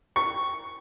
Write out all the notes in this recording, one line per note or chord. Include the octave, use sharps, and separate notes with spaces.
C#6